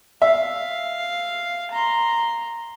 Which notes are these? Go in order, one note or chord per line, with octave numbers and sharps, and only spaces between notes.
E5 F5
A#5 C6